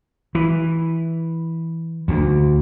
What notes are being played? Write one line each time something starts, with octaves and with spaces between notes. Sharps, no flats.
E3
D2